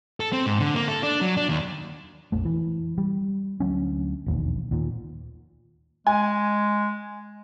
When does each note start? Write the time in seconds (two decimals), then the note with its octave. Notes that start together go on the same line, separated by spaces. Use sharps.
0.20 A4
0.33 C4
0.46 G#2
0.60 D3
0.74 A#3
0.88 A4
1.03 D4
1.21 F#3
1.37 D4
1.49 D#2
2.32 A#1 F2 A3
2.45 E3
2.98 G3
3.60 D2 F#3 C#4
4.26 E1 A#1 D#2
4.71 D#2 A#2
6.07 G#3 G#5